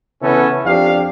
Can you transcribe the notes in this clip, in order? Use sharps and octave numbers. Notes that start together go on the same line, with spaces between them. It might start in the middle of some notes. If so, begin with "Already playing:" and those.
C#3 E3 B3 C#4 A4
F2 D4 G4 F5